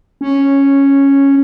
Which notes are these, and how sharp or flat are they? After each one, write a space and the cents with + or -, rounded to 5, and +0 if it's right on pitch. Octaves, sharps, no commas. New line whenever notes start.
C#4 -5